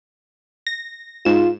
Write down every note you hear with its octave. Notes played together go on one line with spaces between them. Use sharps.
A#6
G#2 F4 E7